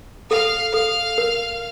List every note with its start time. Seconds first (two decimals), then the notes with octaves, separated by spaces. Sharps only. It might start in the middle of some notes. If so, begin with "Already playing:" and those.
0.30 A4 F5
0.73 A4 F5
1.18 A#4